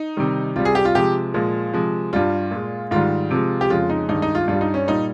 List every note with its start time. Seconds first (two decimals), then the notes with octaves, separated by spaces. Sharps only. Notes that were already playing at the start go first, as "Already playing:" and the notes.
Already playing: D#4
0.17 C3 D#3 G3
0.56 C3 G3 F4
0.65 G#4
0.75 G4
0.85 F4
0.95 C3 F3 G#3 G4
1.34 A#2 F3 G#3
1.73 C3 F3 G#3
2.13 G2 G3 F4
2.51 A#2 G#3
2.91 G#2 D#3 G3 F4
3.31 C3 F3 G#3
3.61 G4
3.70 F2 C#3 G#3 F4
3.90 D#4
4.09 G2 D#3 G#3 D#4
4.22 D#4
4.35 F4
4.48 G2 G3 F4
4.61 D#4
4.74 C#4
4.87 A#2 G3 D#4